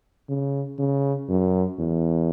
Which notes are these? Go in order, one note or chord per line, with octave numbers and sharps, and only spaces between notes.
C#3
C#3
F#2
E2